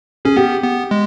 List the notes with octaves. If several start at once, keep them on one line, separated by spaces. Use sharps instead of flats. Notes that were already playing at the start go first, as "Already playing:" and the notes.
C#4 G#4
B3 G4
B3
G#3